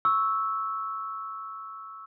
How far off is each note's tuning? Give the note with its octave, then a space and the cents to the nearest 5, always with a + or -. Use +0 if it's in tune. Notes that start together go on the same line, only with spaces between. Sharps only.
C#6 +0 E6 -5